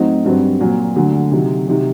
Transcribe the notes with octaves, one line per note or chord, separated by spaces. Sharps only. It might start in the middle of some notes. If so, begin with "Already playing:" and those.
Already playing: A2 F#3 C4 D#4
G2 F#3 C4
A#2 F#3 A#3
D2 D3 F#3
C3 D#3 F#3
C3 D#3 F#3